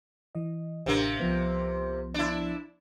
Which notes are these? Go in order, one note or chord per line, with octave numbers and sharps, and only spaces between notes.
E3 D#5
A1 C3 A#3 D4
C2 F3 B3
D4 E4